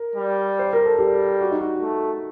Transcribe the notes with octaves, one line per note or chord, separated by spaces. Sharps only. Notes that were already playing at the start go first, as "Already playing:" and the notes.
Already playing: A#4
G3
C5
A#4
A4
G3 G4
F#4
D#4
F#4
A3